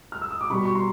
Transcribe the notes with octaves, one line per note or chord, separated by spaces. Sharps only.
F6
E6
D#6
D6
B2 G3 B5 C#6
C#6
A#5 C6